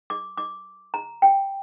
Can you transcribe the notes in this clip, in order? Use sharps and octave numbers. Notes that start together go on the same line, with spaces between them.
D6
D6
A#5
G5